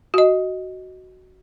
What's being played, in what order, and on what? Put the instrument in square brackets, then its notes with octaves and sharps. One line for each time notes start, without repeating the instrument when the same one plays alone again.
[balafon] F#4 D#5